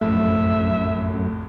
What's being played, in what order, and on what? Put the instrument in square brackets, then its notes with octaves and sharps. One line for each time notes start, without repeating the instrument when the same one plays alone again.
[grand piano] F1 A#1 A2 [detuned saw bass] F#2 [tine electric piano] A3 [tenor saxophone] E5